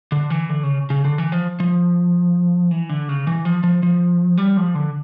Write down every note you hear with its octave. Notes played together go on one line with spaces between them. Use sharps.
D3
E3
D3
C#3
C#3
D3
E3
F3
F3
E3
D3
C#3
E3
F3
F3
F3
G3
F3
D3